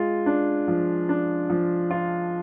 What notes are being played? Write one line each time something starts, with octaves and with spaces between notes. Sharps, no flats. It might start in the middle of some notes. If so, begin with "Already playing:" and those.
Already playing: G#3 F4
D4
F3
D4
F3
F4